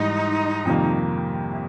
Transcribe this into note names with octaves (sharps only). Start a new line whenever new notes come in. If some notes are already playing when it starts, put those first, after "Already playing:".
Already playing: G#2 E3 G3 D#4
F2 C3 D#3 G3 A#3
E4